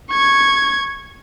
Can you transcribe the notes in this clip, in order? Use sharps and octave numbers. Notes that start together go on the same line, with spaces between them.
C#6 G#6